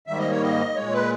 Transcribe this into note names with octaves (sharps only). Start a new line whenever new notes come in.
G#2 D#3 G3 A#3 E5
D#5
C#5
D#5
A#2 G#3 C#5
B4